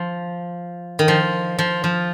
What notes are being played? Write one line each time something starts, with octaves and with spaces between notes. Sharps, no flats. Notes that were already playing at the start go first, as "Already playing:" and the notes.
Already playing: F3
D#3
F3
F3
F3